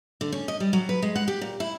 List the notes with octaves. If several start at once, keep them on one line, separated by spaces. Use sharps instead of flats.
D3
C#4
D#5
G3
F#3
B4
G#3
F#5
G4
A#2
E4